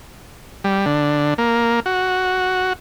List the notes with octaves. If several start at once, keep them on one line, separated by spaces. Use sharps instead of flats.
G3
D3
A#3
F#4